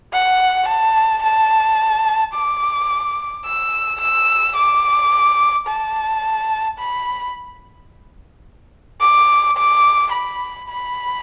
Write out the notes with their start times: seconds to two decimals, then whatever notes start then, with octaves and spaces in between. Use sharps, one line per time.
0.13 F#5
0.68 A5
1.23 A5
2.34 D6
3.46 E6
4.01 E6
4.56 D6
5.68 A5
6.79 B5
9.00 D6
9.57 D6
10.12 B5
10.68 B5